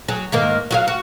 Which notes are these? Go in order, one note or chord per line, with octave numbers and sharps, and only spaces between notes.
F#3 G#4
G#2 D#3 A#3
F#3 F#4 F5
F#4